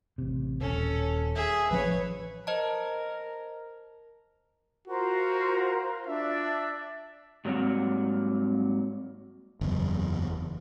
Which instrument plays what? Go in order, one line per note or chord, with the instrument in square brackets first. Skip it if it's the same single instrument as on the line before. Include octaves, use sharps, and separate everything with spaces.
[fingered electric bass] A1 C3
[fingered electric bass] D#1 [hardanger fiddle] C#4 A4
[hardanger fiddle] G#4 E5
[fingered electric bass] A1 F3 C#4 [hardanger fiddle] B4 C#5
[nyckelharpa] A#4 [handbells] C5 D#5 A5
[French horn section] F4 [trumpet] F#4 [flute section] A#4 C5 A#5
[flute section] D4 D5 [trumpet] E5
[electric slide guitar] G#2 F#3 G3 A#3 C4 F#5
[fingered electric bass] F#1 E2